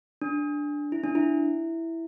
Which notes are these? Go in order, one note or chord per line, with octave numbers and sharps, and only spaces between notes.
D4
E4
D4
E4